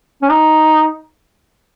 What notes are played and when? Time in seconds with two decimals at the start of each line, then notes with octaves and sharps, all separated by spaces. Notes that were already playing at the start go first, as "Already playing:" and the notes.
0.22 C#4
0.30 D#4